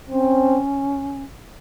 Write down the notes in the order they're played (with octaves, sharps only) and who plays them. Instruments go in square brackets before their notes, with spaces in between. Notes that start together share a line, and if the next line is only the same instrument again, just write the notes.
[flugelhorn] C4 [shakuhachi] C#4